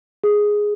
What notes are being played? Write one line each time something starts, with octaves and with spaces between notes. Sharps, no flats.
G#4